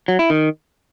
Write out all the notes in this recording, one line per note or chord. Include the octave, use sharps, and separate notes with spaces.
F#3
E4
D#3